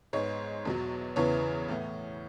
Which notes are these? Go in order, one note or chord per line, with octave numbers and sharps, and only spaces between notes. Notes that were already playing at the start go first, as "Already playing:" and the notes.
G#2 G#3 B3 C#5
E2 B2 F#3
E2 C#3 E3 B3 C#5
A2 E3 B3